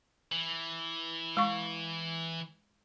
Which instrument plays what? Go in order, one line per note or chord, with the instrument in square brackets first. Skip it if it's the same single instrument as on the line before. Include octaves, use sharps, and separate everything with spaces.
[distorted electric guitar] E3
[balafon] G#3 C#6